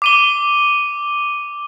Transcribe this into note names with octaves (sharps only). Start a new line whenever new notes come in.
D6 D#7 G7